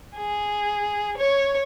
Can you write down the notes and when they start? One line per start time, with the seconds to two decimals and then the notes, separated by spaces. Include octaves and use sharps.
0.17 G#4
1.18 C#5